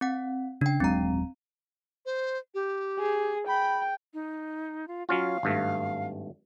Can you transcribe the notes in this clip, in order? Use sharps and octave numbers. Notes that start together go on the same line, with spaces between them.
C4 F#5
C#3 D4 G5
D#1 F#3 G#3 C4 A#5
C5
G4
G#4
G5 B5
D#4
F4
F#3 C#4 F4 F5
G#1 G2 A3